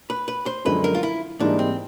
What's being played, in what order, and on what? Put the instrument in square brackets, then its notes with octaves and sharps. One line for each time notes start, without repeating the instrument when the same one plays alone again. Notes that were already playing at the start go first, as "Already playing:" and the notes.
[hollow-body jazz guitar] B4
B4
C5
[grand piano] F#2 D3 F3 G#3 [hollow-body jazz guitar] B4
[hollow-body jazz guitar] A#4
F4
E4
[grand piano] G#2 E3 G3 A#3 D#4 [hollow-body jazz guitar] D4
[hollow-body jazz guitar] C4